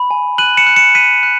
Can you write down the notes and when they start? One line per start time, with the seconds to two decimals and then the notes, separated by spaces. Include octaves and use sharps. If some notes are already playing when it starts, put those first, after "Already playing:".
Already playing: B5
0.11 G#5
0.38 F#6 D#7 F#7
0.57 C#7 E7
0.67 F#6
0.76 C#7 E7
0.95 F#6 B6 D#7
1.23 F#6